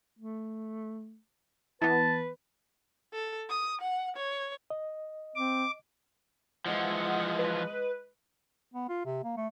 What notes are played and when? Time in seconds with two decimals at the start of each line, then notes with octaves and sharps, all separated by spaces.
0.19 A3
1.82 E3 B3 B4 A5
3.14 A4
3.50 D#6
3.81 F#5
4.16 C#5
4.70 D#5
5.36 C4 D6
6.66 E3 F3 G#3 D#5 F#5
7.39 B4
8.74 B3
8.89 F4
9.05 C3
9.24 A#3
9.37 A3